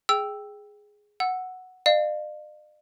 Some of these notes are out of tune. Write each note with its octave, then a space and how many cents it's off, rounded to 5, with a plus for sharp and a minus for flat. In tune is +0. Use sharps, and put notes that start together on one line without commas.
G#4 +0 G5 +0 E6 +0
F#5 +0 E6 +0
D5 +45 F5 +0